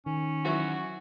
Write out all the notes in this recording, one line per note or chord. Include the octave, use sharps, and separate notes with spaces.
D#3 C#4
E3 F#3 E4 F#4